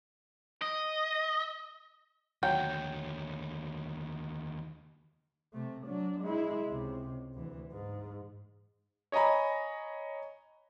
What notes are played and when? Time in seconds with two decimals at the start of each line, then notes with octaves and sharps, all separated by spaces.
0.62 D#5
2.43 D#2 D3 F#3 G5
5.53 C3 A3
5.86 F#3 D4
6.21 G#3 E4
6.66 C#2 C3
7.34 D2 E3
7.71 G#2
9.12 C#5 D#5 G#5 A#5 B5